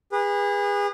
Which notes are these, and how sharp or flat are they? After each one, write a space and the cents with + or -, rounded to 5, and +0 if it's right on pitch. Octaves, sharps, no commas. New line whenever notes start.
G#4 -35 B4 -15